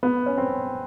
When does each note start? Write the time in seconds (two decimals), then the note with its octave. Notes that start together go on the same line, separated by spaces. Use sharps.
0.03 B3
0.26 C#4
0.37 C4